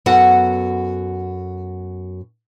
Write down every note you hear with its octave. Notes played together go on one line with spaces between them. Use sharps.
F#2 B3 F#4 A4 F#5